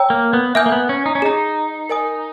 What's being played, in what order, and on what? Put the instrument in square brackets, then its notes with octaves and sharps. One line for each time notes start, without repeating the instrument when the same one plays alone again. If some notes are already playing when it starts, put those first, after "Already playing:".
Already playing: [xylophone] C#5 G5 A#5 E6
[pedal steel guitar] A#3
B3
[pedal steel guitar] A#3 [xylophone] E5 G#5 D#6 G6
[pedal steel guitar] A#3
B3
C#4
D#4
C#4
[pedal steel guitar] D#4 [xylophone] G#4 D#5 A#5
[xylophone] A#4 D#5 G#5 D#6